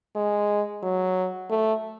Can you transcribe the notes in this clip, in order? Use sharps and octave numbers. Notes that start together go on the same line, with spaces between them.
G#3
F#3
A3